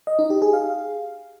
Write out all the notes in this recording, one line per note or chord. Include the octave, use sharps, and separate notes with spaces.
D#5
D#4
G4
G#4
F5